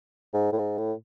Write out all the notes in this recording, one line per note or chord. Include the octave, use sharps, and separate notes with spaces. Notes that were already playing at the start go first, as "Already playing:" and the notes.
G#2
A2
G#2
A2